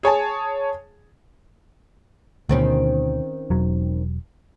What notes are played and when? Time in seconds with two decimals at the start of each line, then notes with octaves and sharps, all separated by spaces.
0.03 G#4 C#5 G#5 A5
2.49 D2 B2 D#3 C4 C#4
3.50 E1 F#3